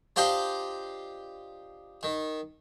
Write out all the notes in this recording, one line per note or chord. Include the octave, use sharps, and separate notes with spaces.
D4 F4 G4 C5 D#5 G5
D#3